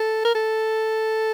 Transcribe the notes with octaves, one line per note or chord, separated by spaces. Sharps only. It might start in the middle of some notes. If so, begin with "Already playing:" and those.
Already playing: A4
A#4
A4